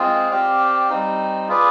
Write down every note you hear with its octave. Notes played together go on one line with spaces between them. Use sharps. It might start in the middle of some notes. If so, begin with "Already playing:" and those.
Already playing: G#3 C4 F4 G#4
C4 G4 D5 F5
G3 C4 D#4
F4 G#4 B4 D5